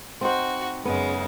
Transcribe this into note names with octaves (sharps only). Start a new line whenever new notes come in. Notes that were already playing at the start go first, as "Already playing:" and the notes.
C4 D#4 F#4 C5
F#2 C#3 G#3 B3